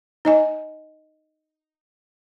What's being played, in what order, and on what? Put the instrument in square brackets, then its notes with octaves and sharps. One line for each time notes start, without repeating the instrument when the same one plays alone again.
[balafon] D#4 D#5 G#5